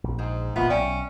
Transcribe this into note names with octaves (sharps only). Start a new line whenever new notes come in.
A#1
G#2 G#4 C5
E1 A#2 A#3 B3 F4 E5
B1 C#4 D5 E5 G5